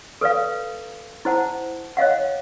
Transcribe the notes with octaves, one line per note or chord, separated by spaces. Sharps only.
A4 B4 D5 F5
E4 C5 F#5 A5
C#5 D#5 F5 F#5